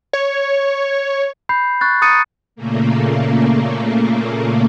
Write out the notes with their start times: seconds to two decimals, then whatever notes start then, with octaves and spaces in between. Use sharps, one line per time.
0.13 C#5
1.49 B5 G6 C7
1.81 C#6 F#6 A6
2.02 A#5 D#6 A6 C#7 D#7
2.56 A#2 C#3 A3 A#3